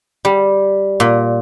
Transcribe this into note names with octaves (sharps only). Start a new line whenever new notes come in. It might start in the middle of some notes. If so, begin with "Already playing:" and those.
G3
A#2